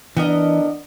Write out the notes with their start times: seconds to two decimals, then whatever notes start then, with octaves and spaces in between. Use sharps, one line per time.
0.17 E3 B3 D4 A#4 D#5